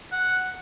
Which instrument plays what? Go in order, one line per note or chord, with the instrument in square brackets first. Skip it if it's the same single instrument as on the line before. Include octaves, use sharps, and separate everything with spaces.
[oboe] F#5